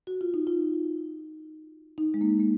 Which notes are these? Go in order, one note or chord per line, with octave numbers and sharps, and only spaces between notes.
F#4
F4
D#4
F4
D#4
G#3
A#3
A#3